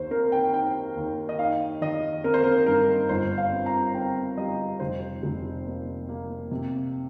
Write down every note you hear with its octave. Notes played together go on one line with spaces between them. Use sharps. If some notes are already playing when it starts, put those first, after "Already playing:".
Already playing: D#2 C5
C4 A#4
G5
D#4 G5
D#2
D#5
D#4 F5
D#3 D#5
C4 A#4
C5
A#4
G2 A#4
G1 C5
F5
C4
A#5
C4 G5
G3 D#5
F1 C5
F1
A#3
A#3
C3